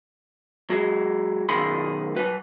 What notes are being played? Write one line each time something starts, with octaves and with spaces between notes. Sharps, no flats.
F#3 G#3
B1 F#2 D#3 G#4 B5 C6
F#3 B4